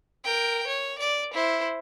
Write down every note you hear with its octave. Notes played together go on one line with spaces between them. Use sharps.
A#4 G5
C#5
D5
E4 C5